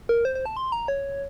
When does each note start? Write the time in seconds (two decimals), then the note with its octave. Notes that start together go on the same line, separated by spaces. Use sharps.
0.09 A#4
0.25 C5
0.35 C5
0.46 A5
0.57 C6
0.72 A#5
0.88 C#5